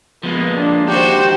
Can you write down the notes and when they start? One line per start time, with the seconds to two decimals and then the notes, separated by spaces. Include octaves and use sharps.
0.23 F3 G#3 A#3 B3
0.58 D4
0.88 D#3 F#4 G4 C5